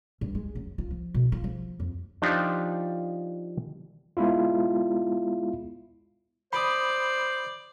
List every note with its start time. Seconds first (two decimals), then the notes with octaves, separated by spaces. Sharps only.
0.21 G2
0.35 G#3
0.55 F#2
0.78 F4
0.91 F3
1.14 B2
1.32 F4
1.44 F3
1.80 F2
2.22 F3 D4 D#4 F4 G4
4.17 G#3 B3 E4 F4
6.53 C5 D5 B5 D#6